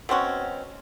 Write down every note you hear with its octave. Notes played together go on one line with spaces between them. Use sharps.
B2 C4 C#4 F#4